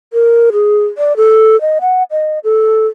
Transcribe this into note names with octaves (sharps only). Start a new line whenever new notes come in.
A#4
G#4
D5
A4
D#5
F#5
D#5
A4